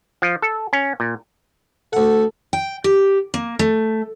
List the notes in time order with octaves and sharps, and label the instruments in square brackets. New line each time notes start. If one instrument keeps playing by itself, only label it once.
[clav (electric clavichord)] F3
A4
C#4
A#2
[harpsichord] D2 F#5 [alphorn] A4
[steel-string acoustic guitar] G5
G4
A#3
A3